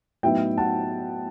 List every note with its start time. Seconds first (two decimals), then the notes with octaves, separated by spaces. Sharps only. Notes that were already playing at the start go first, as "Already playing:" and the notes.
0.23 A2 F#3 B3 D#4 E5 G5
0.58 F#5 A5